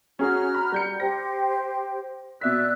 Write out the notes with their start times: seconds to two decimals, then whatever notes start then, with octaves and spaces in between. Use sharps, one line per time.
0.19 C#4 F#4 G#4 A#5 F6
0.54 B5
0.72 G3 G6 C#7
1.00 G4 C5 G5 A#6
2.41 B2 D5 E5 E6 F#6 B6